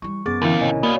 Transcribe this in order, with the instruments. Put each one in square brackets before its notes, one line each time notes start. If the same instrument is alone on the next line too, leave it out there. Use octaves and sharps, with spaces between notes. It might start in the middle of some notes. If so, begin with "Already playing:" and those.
[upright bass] E3 G3 [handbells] C#6
[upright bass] F#2 [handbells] B3 D6 A6 [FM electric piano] G#4
[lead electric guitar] D#2 F5 [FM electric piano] D3 E3 [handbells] C#4 E4 A#4
[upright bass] B1 [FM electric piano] A2 C3 D#3 [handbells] C#5 D#5 G#5
[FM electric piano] A#3 [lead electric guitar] B3 C#4 [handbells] F#4 D5 F5